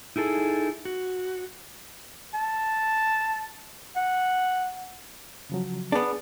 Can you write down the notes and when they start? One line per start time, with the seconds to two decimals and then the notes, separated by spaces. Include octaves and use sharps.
0.16 D#4 E4 G#4 A4
0.85 F#4
2.34 A5
3.96 F#5
5.50 C#3 F3 F#3
5.92 B3 D4 G#4